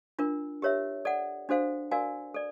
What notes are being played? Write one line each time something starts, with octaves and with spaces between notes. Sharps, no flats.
D4 F4 A#4
G4 A#4 C#5 E5
A4 D5 F#5
D4 F#4 A4 C5 F5
F#4 A#4 D5 F5 G#5
A4 D5